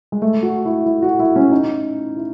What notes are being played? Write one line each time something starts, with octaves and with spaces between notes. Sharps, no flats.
G#3
A3
F#4
E4
E4
F#4
E4
C#4
D#4
E4